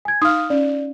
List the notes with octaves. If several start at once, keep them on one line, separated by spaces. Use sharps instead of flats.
G#5 G#6
D#4 F5 D#6 F6
C#4 D5